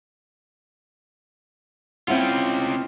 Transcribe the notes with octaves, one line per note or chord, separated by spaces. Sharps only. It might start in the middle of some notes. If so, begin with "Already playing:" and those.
C4 C#4 E4 F4 F#5